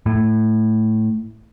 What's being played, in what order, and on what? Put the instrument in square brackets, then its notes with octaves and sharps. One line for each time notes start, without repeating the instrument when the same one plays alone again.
[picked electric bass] A2